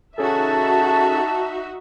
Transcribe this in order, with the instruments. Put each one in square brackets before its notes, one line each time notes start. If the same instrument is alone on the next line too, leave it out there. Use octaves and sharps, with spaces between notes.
[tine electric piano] C#4 G#4 A4 [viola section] D#4 F#4 E5 [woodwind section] A5